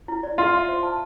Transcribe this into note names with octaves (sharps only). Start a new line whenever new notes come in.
E4
D5
F4 C6
E5
C5
A5